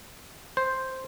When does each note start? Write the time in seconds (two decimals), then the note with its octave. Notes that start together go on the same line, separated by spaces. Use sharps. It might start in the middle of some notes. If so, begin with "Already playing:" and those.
0.57 C5